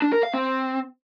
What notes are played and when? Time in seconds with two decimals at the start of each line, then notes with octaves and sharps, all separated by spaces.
0.02 D4
0.13 A#4
0.23 F5
0.34 C4